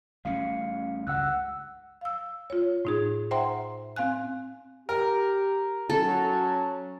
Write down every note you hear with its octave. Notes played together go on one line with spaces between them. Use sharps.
A1 G3 C#4 F5 C#7
C#2 G2 F#5 E6 F#6
F5 E6
F4 C#5
A2 D#4 G#4
C5 E5 F#5 G5 A#5 C6
C4 F5 G#5 F#6
G4 A#4
F#3 C#4 A4 A5